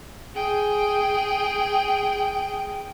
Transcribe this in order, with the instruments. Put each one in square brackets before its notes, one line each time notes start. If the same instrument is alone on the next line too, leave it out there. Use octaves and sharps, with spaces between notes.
[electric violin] G#4 G5